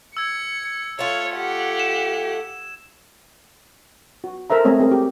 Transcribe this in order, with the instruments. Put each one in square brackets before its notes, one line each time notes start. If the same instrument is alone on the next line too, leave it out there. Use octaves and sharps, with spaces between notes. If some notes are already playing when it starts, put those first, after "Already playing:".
[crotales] E6 G#6 [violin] C#7
[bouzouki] A3 F4 [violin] C#5
[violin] G4 F#5
[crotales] E7
[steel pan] F#4
A4 A#4 C5 E5 A#5
G#3 A3 C4 C#5 D#5
C4 G#4 A#4
G4